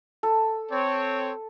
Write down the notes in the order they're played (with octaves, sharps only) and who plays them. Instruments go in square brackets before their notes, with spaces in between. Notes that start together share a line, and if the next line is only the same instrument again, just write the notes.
[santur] A4
[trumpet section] C4 C#5